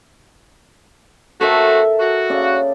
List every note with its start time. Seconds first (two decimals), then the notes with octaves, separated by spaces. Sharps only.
1.41 A3 C4 F#4 A4 A#4 E5
2.00 F#4
2.30 C#3 D5